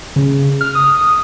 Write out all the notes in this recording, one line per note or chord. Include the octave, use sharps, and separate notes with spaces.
C#3
F6
D#6